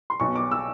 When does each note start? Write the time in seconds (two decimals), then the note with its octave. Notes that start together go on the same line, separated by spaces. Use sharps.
0.10 C6
0.20 B1 B2 C#6
0.36 D6
0.51 E6